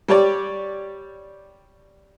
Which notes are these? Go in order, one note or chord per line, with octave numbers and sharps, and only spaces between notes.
G3 G4 C#5 D5